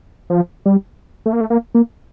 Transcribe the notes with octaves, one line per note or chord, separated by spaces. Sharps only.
F3
G3
A3
A#3
A3
A#3
A#3